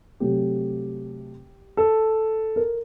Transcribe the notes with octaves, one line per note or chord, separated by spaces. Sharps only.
C3 F#3 A3 C4 G4
A4
A#4